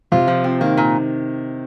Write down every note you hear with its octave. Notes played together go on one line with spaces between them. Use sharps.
C3 F4
F3
C4
D#3 A#3
A#2